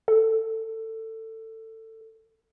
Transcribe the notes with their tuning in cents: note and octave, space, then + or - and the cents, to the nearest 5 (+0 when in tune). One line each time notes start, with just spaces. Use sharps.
A4 +20